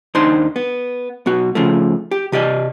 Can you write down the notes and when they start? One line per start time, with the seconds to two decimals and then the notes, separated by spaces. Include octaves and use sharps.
0.15 D#2 D4 D#4 C5 C6
0.56 B3
1.26 B1 B3 F#4
1.55 C#3 F3 A3
2.11 G4
2.32 C3 G4 D5 D#5